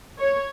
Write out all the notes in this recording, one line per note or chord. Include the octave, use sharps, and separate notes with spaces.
C#5